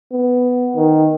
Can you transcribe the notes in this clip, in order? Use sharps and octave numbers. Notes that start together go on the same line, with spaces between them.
B3
D#3